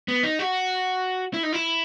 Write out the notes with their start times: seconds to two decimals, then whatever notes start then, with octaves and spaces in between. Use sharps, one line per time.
0.08 B3
0.23 D#4
0.39 F#4
1.34 E4
1.43 D#4
1.53 E4